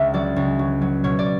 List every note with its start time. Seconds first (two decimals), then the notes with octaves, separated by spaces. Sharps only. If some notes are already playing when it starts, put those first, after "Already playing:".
Already playing: C#2 E5
0.14 F#3 D5
0.36 C#2
0.59 F#3
0.81 F#3
1.04 B2 C#5
1.19 D5